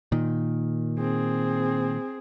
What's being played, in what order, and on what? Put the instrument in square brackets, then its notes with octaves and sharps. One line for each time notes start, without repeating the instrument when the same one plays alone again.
[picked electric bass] A#2 D#3
[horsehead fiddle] C4 G#4